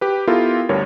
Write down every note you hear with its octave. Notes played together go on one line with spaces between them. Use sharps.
G4 B4
B3 E4 F4 G4 A4 A#4
D2 G2 A#4 C#5